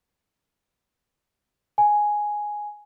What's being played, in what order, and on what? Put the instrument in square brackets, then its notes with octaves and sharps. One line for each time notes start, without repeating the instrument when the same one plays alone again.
[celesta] G#5